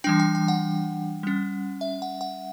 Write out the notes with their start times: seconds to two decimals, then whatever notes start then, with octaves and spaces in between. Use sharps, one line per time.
0.04 E3 G3 D4 G5
0.20 G5
0.35 G5
0.48 F#5
1.23 G3 C#4
1.81 E5
2.02 F#5
2.21 F#5